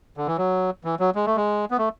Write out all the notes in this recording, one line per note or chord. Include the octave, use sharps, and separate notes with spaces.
D3
E3
F#3
E3
F#3
G#3
A3
G#3
B3
A3